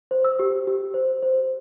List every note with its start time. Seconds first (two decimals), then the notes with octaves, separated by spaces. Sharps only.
0.11 C5
0.25 E6
0.39 G4
0.67 G4
0.94 C5
1.23 C5